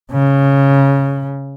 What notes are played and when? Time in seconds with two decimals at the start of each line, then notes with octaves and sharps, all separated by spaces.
0.12 C#3